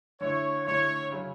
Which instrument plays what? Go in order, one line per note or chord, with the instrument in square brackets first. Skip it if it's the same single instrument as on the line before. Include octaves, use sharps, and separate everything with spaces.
[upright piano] D3 A3 E4 [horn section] C#5
[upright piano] D3 A3 E4 [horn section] C#5
[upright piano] C#3 F#3 C#4